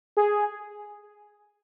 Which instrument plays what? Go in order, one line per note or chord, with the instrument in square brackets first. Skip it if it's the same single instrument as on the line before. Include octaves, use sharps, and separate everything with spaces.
[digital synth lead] G#4